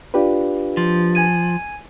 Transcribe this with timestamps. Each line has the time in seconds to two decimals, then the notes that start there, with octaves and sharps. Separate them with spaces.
0.14 D4 F4 G4 B4 D5 F5
0.77 F3
1.15 G#5 G#6 D#7